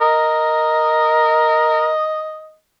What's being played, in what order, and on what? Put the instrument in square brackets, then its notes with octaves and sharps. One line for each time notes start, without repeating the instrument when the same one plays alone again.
[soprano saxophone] A#4 [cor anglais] D#5